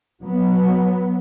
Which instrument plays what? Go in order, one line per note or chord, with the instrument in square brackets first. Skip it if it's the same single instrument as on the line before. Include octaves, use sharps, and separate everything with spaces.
[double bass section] F#3 B3